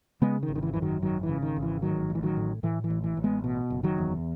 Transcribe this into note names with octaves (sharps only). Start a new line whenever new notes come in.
C#3 G#3 B3
D#3
G#1
D#3
E3
F#2 E3
D#3 F#3
G#1 D#3 F#3
E3
C#3
D#3
G#1
E3
A1 D#3 F#3
A1
E3
D#3 F#3
A2
A2 E3
E3
A1
E3
A1
G#3 B3
B2
F#1
D#3 F#3
E2